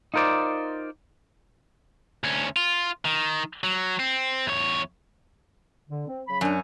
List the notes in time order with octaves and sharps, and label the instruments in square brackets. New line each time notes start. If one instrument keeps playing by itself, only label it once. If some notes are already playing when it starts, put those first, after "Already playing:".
[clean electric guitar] D#4 F4 A#4 C5 D5
[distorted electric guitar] D2 C#4
F4
D#3
F#3
C4
E2 C#5
[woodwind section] D3
C4
C#3 F#3 B5
[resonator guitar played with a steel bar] F#2 C#4 [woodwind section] D4